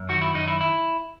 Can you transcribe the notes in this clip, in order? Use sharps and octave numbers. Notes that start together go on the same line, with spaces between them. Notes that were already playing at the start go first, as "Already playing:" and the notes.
Already playing: F#2
D#3 F#4
E4
F#2 D#4
E4
E4